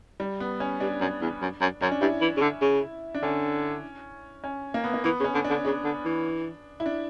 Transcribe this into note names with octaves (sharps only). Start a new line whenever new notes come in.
G3
B3
C#4
G2 D4
F#2
E2
F#2
F#2
F#2 C#4
D4
G2 E4
E3
C#3
D3
C#3
D4
D3 C#4
C#4
A#3
B3
A#3
E3 B3
C#3
C#4
D3
D4
D3
C#3 D4
D3
E3
E4
D4